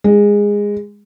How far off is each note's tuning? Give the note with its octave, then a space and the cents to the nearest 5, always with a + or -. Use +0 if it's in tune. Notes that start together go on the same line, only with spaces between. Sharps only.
G#3 -15